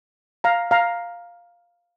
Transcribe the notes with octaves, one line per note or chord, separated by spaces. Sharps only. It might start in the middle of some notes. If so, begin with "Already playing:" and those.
F5 A#5
F5 A#5